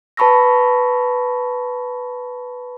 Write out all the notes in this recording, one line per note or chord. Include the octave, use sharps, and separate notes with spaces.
B4 A5 B5 C#6 E6 A#6